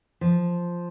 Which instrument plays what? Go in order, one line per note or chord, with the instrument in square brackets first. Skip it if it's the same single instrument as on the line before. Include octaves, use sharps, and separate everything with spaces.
[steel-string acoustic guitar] F3